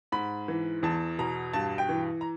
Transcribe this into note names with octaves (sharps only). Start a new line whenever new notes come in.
G#2 B5
E3
E2 A5
B2 A#5
G2 A5
G5
E3
A#5